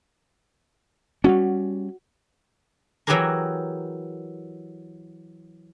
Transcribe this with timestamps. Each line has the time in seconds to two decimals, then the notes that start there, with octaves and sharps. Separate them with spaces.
1.24 G3 A3 C#4 F#4
3.07 E3 F#3 E4 G4 G#4 A#4